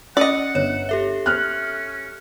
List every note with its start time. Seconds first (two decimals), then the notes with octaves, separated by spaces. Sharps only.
0.17 C#4 D5 D#5 F#5
0.55 G1 C#5
0.89 G4 A4 E5
1.26 C#4 F6 F#6